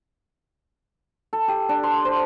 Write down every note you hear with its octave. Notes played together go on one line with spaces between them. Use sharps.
A4
G4
D4
C6
C5